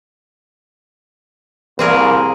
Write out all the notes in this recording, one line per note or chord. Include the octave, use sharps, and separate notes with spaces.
C2 A#3 C4 G#4 A#4